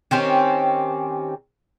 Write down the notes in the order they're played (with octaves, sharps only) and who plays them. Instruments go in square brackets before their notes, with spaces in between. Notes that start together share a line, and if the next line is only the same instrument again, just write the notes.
[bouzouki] D#3 C4 C#4 G4